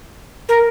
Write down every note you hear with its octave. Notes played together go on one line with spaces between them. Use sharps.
A#4